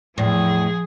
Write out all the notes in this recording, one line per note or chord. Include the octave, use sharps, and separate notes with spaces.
E2 A2 F3 G#4